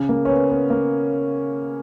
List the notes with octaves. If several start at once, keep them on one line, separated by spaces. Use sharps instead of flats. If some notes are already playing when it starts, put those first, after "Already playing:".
Already playing: C#3
A#3
C#4
B3
B3
A#3